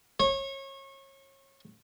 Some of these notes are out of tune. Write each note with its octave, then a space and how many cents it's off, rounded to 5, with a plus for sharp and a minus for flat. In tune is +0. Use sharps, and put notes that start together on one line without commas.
C#5 -30